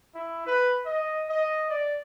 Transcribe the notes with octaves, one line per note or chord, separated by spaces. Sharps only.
E4
B4
D#5
D#5
D5